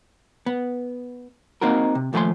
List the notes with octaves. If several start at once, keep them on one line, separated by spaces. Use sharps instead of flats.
B3
A#3 C4 D#4 F#4 A#4
C3
D#2 F3 A3 C5 G#5 C6